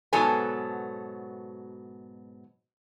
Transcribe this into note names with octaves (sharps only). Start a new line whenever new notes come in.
G#2 B2 F#3 B3 A4 G#5